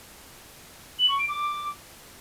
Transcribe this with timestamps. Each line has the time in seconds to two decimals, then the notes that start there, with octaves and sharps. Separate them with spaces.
0.99 F#7
1.09 C#6
1.19 D7
1.28 D6